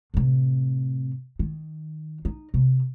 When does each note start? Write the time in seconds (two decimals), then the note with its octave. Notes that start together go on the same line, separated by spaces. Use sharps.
0.14 A2 C3
1.39 D#3
2.25 D#4
2.54 C3